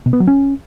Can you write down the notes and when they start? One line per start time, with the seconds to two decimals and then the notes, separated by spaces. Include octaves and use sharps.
0.06 B2
0.13 B3
0.20 F#3
0.27 C#4